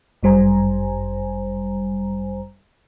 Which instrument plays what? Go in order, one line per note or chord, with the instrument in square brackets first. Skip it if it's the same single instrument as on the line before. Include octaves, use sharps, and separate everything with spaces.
[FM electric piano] G1 F#2 G3 C5 G#5 A#5